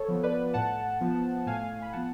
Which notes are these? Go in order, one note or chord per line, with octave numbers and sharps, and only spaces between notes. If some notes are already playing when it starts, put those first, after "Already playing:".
Already playing: A4 C#5
F3 B3
B4 D5
A2 F#5 A5
F3 B3
A2 F5 G#5
B5
F3 B3 F#5 A5